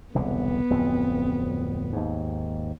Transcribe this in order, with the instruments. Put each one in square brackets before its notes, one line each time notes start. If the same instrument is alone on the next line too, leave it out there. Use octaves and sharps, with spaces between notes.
[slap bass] E1 C2 D3 [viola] B3
[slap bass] D1 F2 C4
D#2 G#2